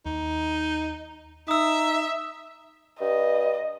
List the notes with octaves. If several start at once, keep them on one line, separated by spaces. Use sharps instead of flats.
D#2 D#4
D#4 E5 D#6 E6
G2 D#5